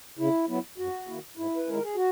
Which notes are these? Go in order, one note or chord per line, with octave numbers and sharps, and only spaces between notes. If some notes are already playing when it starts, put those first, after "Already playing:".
C#3 E4
F#3 B3 E4
F#2 F#4
D#3 A#3 E4
G#2 E4
B4
D#3 G#3 C#4 A#4
G#4
F#4